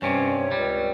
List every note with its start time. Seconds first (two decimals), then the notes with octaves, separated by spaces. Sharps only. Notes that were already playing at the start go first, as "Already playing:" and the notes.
0.02 G2 C3 C#4 C#5
0.51 C#2 G3